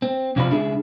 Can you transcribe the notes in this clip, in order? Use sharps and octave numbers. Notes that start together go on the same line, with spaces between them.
C4
F2 C3 C4 F4 D5 B5
C#2 D4 E4 G#4